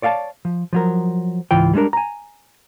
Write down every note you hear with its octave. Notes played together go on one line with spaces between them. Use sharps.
C#5 D5 F5 F#5 A5
F3
F3 F#3 A#4
C#2 G#2 E3 F4 G5
G3 G#3 C#4 D4 A#4
G#5 A#5